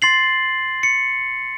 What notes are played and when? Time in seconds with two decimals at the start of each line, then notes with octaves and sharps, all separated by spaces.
0.02 C6 A6 C7 F#7
0.83 C#7